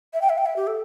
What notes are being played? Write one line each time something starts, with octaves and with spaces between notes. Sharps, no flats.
E5
G5
E5
G5
E5
G4
A4